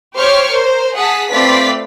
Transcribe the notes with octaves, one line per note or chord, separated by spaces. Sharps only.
G4 C5 C#5 C#6 D6 F6
A#4 C5
G#4 F#5 A5 D#6 B6
A3 C4 F4 B4 D5 B6